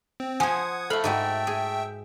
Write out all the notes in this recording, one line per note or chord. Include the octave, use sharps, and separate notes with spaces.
C4
F3 C5 F#5 G#5 D#6 G#6
A3 A4 F5 B5
G#2 G#3 F#4 E5 G5 E6
G#4